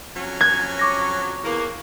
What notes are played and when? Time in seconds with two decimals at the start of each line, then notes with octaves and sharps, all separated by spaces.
0.15 F2 F#3 C#4
0.41 F#6 G#6
0.79 C#6 D6 A#6
1.43 E2 A#3